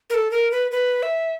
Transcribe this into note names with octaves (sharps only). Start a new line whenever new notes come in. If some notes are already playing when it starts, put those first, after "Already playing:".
A#4
A4
A#4
B4
B4
E5